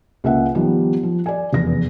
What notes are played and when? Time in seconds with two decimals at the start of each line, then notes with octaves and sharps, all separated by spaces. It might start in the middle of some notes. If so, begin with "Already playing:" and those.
0.24 C#2 A#3 E5 F#5
0.55 D#3 F3 G3 B3 G4
1.03 F3
1.26 D5 G#5
1.53 F1 E2 A#6